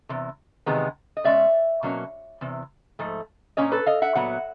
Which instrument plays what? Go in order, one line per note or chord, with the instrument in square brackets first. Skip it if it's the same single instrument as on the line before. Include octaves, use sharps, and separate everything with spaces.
[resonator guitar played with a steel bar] E2 C3
E2 C3 D#3 G#3 B3
D#5
B2 G#3 C#4 D5 E5
B2 F#3 A#3 C#4
E2 C3
G#2 F3 A3
A#2 F3 A#3 C#4 C#5 D#5
A4 B4
D#5 F5
E5 F#5
A#2 F#3 B3 F#5